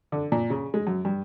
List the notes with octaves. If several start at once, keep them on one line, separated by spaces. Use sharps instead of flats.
D3
A#2
C#3
G#3
F#2
G2